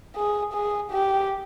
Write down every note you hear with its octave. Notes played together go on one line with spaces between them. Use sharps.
G#4
G#4
G4